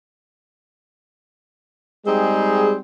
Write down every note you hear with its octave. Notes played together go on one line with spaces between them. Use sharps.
G3 G#3 C4 D#4 G#4